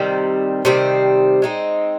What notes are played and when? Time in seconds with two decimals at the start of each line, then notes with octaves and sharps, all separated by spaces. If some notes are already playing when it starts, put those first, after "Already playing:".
Already playing: C3 D#3 G3 C4
0.65 C3 D#3 G3 C4
1.42 G#3 C4 D#4